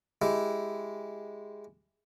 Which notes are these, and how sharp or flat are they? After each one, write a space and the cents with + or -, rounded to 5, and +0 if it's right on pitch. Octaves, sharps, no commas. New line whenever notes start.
G#3 +0 E4 +0 G4 +0